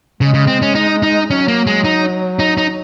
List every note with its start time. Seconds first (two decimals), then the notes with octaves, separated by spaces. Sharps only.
0.21 C#3 G#3
0.34 C#3
0.47 C4
0.62 C#4
0.75 D#4
1.03 D#4
1.29 F#3 C#4
1.48 A#3
1.67 G#3
1.84 D#4
2.39 D#4
2.58 D#4